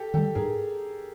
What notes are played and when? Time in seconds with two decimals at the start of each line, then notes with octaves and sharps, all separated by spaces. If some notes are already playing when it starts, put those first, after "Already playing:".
Already playing: G4 A4
0.14 D#3 G3 G4 A4
0.35 G#2 G#4 A#4